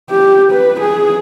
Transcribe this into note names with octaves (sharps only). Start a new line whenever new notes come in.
G4
B4
G#4